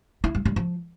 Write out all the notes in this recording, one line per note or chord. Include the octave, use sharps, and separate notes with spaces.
E4
G3
G3
F3